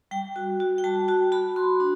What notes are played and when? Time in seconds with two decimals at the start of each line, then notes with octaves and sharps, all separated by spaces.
0.11 G3 G5
0.36 F#4
0.60 F#4
0.78 G5
0.84 G3 A5
1.08 F#4 A5
1.32 F#4 B5
1.56 F#4 C6
1.80 D4